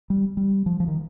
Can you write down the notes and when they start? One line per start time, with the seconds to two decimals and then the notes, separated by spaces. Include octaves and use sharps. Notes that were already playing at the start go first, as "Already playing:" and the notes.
0.10 G3
0.37 G3
0.66 F3
0.80 F3
0.88 D#3